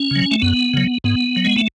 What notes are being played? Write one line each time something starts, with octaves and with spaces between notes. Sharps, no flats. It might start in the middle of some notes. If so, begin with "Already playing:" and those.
Already playing: C#4
C#3 F#3
A3
F#2 B3
C#3 F#3
G#2 B3
F#3
G#3
A3